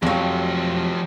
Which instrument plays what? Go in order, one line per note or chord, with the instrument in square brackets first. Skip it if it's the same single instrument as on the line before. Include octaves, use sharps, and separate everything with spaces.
[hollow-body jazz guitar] F2 F#3 [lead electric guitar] F3 G4